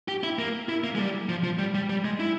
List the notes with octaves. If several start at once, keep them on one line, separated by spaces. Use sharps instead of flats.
G4
E4
A#3
E4
A#3
G#3
G3
F3
F3
G3
G3
G3
G#3
E4